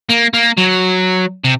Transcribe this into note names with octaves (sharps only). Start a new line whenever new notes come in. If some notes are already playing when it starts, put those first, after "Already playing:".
A#3
A#3
F#3
C3